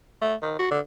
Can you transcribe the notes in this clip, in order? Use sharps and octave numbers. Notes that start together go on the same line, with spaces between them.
A3
D#3
F#4
D3